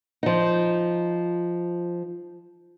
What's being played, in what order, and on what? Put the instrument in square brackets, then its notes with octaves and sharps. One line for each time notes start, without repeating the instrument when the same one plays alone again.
[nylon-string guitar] F3 D#4